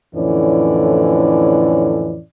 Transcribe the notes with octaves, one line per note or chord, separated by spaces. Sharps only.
F2 A2 D3 E3 C#4 D5